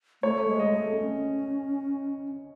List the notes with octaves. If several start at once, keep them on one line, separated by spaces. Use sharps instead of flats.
A3 C#5
G#3
D#5
A3
C#4